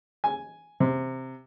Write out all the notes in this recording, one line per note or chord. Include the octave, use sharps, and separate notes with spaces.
G#5
C3